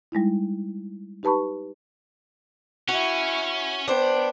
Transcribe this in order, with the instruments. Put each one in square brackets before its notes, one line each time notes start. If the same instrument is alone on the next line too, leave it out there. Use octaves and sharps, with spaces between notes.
[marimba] G3 G#3 D#4 E4
D#4 G4 B4 A5 B5 C#6
[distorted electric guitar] C#4 [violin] E4 C#6 [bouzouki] F#4
[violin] B3 G5 [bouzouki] D4 C5